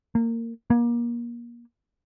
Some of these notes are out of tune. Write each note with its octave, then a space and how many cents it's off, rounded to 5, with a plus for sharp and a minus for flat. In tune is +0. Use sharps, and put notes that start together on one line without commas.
A#3 -20
A#3 +30